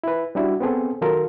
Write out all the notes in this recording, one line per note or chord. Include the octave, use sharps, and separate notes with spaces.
E4 B4
G3 D4 E4 F#4
B3 C4 G#4 A4
D#3 F#3 F4 A4 A#4